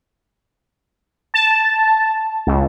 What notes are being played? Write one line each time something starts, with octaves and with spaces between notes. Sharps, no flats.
A5
C#2